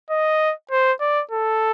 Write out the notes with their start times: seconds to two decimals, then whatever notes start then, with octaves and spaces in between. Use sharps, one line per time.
0.10 D#5
0.71 C5
1.01 D5
1.31 A4